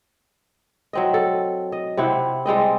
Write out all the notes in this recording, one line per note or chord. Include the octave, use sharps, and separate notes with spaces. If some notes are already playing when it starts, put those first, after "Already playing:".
F#3 C4 D#5
A4
D#5
C3 C4 E4 F#5
G3 G#3 C4 D#5